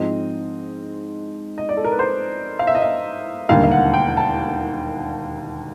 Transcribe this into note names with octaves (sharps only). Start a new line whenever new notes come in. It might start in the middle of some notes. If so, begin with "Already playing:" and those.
Already playing: G#2 F3 G#3 C4 D#5
D#5
D5
A4
A#4
B4
C5
F5
E5
D#5
E5
E1 D#2 D3 G3 A#3 F5
F5
F#5
G5
A5